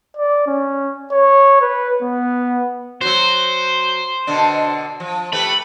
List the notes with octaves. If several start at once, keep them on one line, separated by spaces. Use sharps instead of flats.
D5
C#4
C#5
B4
B3
F#3 F#4 C5
B2 D3 D4
F3
A3 G4 B4 B5